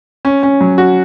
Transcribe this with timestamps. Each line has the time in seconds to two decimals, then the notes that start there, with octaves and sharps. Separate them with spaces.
0.25 C#4
0.43 C#4
0.61 F#3
0.78 F#4